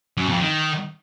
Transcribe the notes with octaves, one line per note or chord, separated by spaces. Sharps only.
F#2
F2
D#3